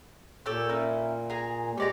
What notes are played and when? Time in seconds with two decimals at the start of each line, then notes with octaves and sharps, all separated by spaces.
0.46 A#2 G4 A4 C#5
0.69 C#4 D#4 E4
1.30 G#4 A#5
1.78 G#3 G4 C#5 D5 A#5